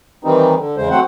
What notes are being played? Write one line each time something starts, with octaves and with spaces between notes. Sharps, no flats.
D#3 E3 G3 C4 D#4
D3
E2 C#3 G#3 C5
F#3 A3 C4 C5 F#5